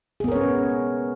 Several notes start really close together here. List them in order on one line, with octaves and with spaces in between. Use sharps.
G#4 B3 A#4 C#5 C#4